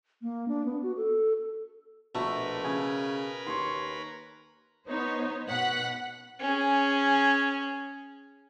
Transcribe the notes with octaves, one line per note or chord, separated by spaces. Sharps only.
A#3
D4
B3
F#4
A4
A#1 B2 A3 A#4 B4
C#3 G#5
D#2 C#5 C6
B3 D#4 C5 C#5
B2 F#5 F#6 B6
C#4 G#4